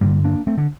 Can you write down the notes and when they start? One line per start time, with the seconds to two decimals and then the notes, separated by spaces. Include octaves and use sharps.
0.01 G2 D3 G3 A#3
0.24 A#3 D4
0.47 A3 C4
0.58 D3